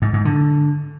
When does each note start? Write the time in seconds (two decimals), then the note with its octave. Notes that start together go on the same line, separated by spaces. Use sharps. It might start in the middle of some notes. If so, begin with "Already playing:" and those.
0.02 G#2
0.13 G#2
0.25 D3